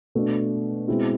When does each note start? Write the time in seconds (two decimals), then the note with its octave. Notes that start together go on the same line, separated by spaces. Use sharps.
0.15 B2 A3 D4
0.88 B2 G#3 C4 E4